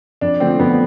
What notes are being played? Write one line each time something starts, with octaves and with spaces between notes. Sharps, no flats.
F2 D4
D3 F3 A3 C4
F2 B3